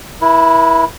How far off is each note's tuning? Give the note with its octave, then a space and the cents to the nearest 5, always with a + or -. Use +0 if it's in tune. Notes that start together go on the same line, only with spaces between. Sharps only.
E4 +0 B4 -45